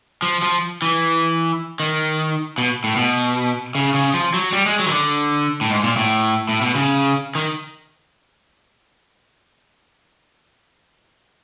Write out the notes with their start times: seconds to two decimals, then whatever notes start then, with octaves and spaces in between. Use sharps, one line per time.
0.22 F3
0.43 F3
0.82 E3
1.80 D#3
2.58 B2
2.84 A2
2.96 B2
3.75 C#3
3.94 C#3
4.14 F3
4.34 F#3
4.53 G3
4.66 G#3
4.79 F#3
4.87 D#3
4.92 D3
5.61 A2
5.70 G#2
5.83 A#2
5.97 A2
6.49 A2
6.62 B2
6.75 C#3
7.35 D#3